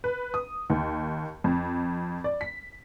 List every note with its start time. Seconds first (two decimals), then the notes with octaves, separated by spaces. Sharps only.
0.04 B4
0.34 D#6
0.70 D#2
1.44 F2
2.24 D5
2.41 B6